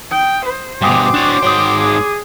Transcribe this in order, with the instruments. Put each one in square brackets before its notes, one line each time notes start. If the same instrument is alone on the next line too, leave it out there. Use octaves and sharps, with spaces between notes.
[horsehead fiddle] G5 [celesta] D#6
[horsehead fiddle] C5
[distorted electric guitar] G2 B2 [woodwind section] F#4 C6 D6 [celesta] G5 G#5 D#6
[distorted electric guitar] D4 C#5
[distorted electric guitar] G#2 G5 [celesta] C#5 D#6
[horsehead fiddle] G#4